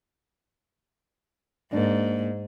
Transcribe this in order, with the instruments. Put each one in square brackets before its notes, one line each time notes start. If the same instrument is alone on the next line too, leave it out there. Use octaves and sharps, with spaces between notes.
[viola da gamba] G#2 [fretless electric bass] A#3 D4